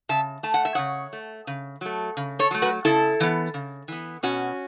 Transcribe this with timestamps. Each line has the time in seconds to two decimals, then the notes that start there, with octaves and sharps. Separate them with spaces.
0.09 C#3 E5 A5
0.43 A3 A5
0.54 F#5
0.65 E5
0.75 C#3 C#5 F#5
1.13 A3
1.47 C#3
1.81 F#3 A3
2.17 C#3
2.39 A4 C#5
2.51 F#3 A3
2.62 F#4 B4
2.85 C#3 E4 A4
3.20 E3 B3
3.54 C#3
3.88 E3 B3
4.23 B2 C#4 F#4